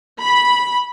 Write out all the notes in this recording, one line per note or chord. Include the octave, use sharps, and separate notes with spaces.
B5